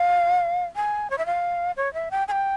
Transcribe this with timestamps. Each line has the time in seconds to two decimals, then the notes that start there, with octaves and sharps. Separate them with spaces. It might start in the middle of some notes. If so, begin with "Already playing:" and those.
Already playing: F5
0.76 G#5
1.10 C#5
1.18 E5
1.26 F5
1.77 C#5
1.94 E5
2.11 G5
2.28 G#5
2.32 G5